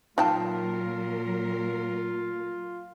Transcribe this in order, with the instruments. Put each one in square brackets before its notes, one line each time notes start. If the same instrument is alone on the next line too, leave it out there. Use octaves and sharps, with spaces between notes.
[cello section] A#2 F#3 A#4 [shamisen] D#4 G5 A5 [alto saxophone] F4